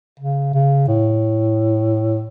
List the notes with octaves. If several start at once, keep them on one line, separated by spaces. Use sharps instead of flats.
C#3
C#3
A2